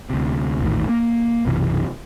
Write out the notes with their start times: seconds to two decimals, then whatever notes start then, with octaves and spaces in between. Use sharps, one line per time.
0.10 D2 C3
0.61 A#1 E2 A2 D#3
0.89 A#3
1.46 B1 F#2 C3 E3